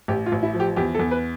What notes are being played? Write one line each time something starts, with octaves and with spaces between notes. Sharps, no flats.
A1 G4
F4
A1
E4
F3
G4
E2 G4
A4
E2
B4